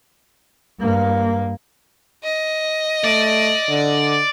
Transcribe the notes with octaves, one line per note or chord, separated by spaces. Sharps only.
G2 A#3
D#5
A3 D5
D3